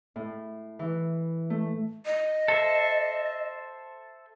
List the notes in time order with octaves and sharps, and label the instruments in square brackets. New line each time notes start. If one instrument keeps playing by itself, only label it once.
[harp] A2
E3
A3
[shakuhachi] D#5
[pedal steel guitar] A4 C5 E5